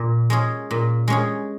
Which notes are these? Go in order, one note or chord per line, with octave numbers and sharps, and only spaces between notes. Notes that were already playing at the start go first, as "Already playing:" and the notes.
Already playing: A#2
G#3 C#4 G#4
A#2
G#3 C#4 G#4